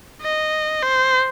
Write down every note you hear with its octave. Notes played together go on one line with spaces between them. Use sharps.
D#5
C5